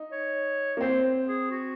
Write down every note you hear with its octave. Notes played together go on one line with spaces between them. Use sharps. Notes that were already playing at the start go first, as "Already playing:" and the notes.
Already playing: D#4
C#5
A#3
C4 C5
G#4
F#4